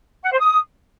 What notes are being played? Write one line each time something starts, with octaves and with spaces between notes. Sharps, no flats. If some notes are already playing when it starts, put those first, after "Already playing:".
F#5
C5
D#6